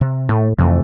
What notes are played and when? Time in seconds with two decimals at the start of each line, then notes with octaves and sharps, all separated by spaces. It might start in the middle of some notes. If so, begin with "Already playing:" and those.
0.01 C3
0.29 A2 A3
0.59 F2 C3 E3 A3